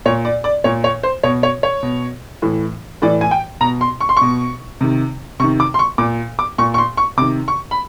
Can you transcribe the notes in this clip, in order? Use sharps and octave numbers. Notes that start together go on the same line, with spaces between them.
A#2 C#5
D5
D5
A#2 C#5
C#5
C5
B2 C#5
C#5
C#5
B2
A2 E3
A2 E3 D5
G#5
G5
B2 A#5
C6
C#6
C6
B2 C#6
C3 D#3
C3 D#3 C#6
D6
C6
C#6
A#2 D6
D6
A#2 C#6
C#6
C6
C#6
C3 D#3 D6
C#6
B5